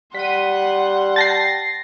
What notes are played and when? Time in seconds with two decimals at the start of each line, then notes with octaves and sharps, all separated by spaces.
0.15 G3 F#5 C6 B6 D#7
1.16 G5 A5 A6 A#6 C7